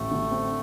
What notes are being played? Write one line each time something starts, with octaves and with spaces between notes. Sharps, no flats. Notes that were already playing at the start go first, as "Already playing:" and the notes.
Already playing: A1 A3
D3
C4